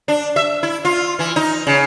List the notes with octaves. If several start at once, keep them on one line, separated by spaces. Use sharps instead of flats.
D4
E5
E4
F4
E3
D#4
C#3